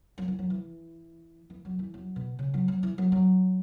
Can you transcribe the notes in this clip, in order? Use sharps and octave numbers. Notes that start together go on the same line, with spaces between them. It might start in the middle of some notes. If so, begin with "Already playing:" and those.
F#3
E3
F#3
E3
E3
F#3
E3
F#2
B2
C#3
F#3
F#3
E3
F#3
F#3